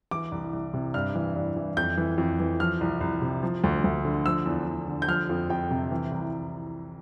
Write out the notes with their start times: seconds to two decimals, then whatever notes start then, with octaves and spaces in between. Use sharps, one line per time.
0.11 E3 D6
0.32 C2
0.53 C2
0.74 C3
0.94 G2 F6
1.15 E3
1.36 G2
1.57 E3
1.77 F2 G6
1.97 E3
2.18 F2
2.40 E3
2.60 F3 F6
2.81 C2
3.01 C2
3.22 C3
3.43 F3
3.64 D2
3.84 D2
4.05 D3
4.26 F3 E6
4.46 E2
4.67 E2
4.88 D3
5.02 G6
5.08 F3 F6
5.29 F2
5.50 F2 G5
5.71 C3
5.91 E3
6.12 C2